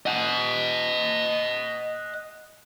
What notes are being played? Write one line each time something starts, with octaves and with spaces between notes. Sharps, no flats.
D#5 F#5